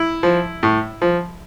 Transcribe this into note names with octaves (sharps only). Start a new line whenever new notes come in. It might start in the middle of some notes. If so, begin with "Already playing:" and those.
Already playing: E4
F3
A2
F3